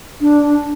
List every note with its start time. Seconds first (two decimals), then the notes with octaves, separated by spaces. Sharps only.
0.21 D4